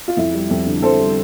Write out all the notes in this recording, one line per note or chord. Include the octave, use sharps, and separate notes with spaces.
F4
F2 E4
G3
F2
D3
F2 A4 C5
G3